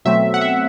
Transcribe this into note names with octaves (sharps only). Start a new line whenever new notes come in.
B2 F#3 A3 C4 E5
F#5
E5